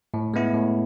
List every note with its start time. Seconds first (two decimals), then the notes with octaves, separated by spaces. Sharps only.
0.14 A2
0.34 G#3 B3 E4
0.54 A2